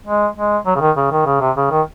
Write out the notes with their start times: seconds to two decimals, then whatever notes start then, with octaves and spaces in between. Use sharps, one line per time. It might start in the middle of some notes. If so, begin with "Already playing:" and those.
0.06 G#3
0.36 G#3
0.66 F#3
0.76 C#3
0.80 D#3
0.97 C#3
1.12 D#3
1.26 C#3
1.41 C3
1.57 C#3
1.71 D#3